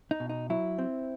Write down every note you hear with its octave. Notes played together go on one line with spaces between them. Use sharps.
D#4
B2
D#4
F#3 E4
C4